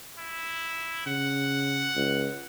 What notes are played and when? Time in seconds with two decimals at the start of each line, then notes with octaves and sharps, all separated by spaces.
0.18 E4
1.06 C#3 F#5
1.96 C#2